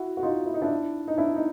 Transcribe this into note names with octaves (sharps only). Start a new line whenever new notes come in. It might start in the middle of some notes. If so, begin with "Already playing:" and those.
Already playing: E4 F#4
F#4
D#4 F4
E4
D#4
D4 E4
D#4
D4 E4
D#4